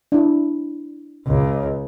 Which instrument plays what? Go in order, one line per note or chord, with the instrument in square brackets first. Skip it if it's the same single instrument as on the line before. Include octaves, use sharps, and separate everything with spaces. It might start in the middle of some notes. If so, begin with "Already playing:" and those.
[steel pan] D4 E4
[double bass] C#2